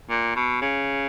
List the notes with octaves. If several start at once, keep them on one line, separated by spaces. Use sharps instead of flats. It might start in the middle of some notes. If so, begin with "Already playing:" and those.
A#2
B2
C#3